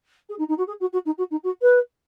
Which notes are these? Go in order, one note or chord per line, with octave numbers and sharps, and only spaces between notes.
G#4
D#4
D#4
F#4
G#4
F#4
F#4
D#4
F#4
D#4
F#4
B4